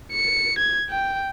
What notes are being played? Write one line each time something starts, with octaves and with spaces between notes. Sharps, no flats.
C#7
G#6
G5